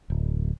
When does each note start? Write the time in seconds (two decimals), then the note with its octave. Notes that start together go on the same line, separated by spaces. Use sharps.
0.10 D1